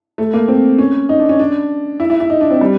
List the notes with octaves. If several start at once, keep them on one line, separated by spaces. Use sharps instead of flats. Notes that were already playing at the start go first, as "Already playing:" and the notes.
A3
A#3
C4
C#4
D#4
D4
C#4
D4
E4
E4
E4
D#4
D4
C4
G3